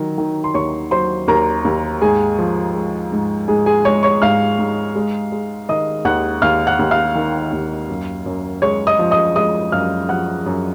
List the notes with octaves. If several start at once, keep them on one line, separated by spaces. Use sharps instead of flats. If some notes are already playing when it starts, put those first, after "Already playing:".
Already playing: D#3 F#3
D#3
C6
D#2 C#5 C#6
F#3 C5 C6
D#2 A#4 A#5
D#2
G#2 G#4 G#5
F3
G#3
G#2
G#2 G#4 G#5
G#4 G#5
G#3 C#5 C#6
C#5 C#6
G#2 F5 F6
G#2
G#3
G#3
D#3 D#5 D#6
D#2 F#5 F#6
D#2 F5 F6
F#5 F#6
D#2
F5 F6
D#3
D#2
F#2
F#2
G#3 C#5 C#6
D#5 D#6
F3
D#5 D#6
G#3 D#5 D#6
F#2 F5 F6
F3 F#5 F#6
F#2